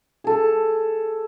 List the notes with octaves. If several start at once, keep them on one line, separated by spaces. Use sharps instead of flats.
G#4 A4